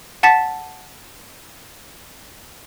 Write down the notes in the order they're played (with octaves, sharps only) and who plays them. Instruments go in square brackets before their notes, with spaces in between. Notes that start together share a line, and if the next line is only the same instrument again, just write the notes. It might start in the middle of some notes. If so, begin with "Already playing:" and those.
[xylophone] F#5 A5 A6 B6 E7